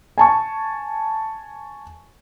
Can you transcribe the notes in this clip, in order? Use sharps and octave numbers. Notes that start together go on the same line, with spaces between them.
G#5 A5 C#6